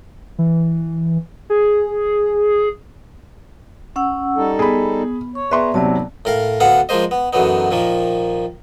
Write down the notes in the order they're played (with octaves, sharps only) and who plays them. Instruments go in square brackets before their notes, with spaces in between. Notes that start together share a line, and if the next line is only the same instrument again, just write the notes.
[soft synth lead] E3
G#4
[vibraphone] C#4 F#5 E6
[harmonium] G3 D#4 A4
[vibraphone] B3 [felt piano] G#4 B5
[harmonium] C#5 [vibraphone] C#6
[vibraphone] B3 D5 E5 [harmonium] G#4 A#5 [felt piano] B4 C6 C#6
[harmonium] D#2 G#2 [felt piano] C3 F#3 [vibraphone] B3 D5 A5
[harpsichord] A2 A#4 F5
D2 B3 A4 F5 F#5
F3 G#3 A#3 C5 D#5
B3
F#2 D3 E3 F#3 B3 D#4
A#2 D#3 F3 A#3